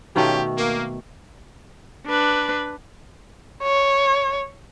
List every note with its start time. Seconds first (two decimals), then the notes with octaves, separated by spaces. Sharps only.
0.16 B2 D#3 A3 C#4 F4 G4
0.58 A#3
2.07 D4 B4
3.63 C#5